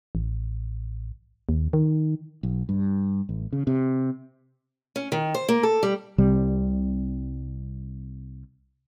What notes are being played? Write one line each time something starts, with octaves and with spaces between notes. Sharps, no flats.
A1
D#2
D#3
B1
G2
A1
C#3
C3
C#4
D#3
C5
A#3
A4
G3
C2 C3 G3